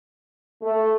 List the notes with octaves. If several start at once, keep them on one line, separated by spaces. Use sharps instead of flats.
A3